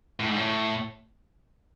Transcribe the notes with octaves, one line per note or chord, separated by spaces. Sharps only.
A2
G#2
A2